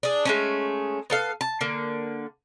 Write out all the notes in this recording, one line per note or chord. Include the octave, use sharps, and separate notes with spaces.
D4 G#4
G#3 A3 C#4
B3 A4 F5
A5
D3 A#3